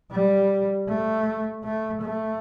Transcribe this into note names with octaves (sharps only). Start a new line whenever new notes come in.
G3
A3
A3
A3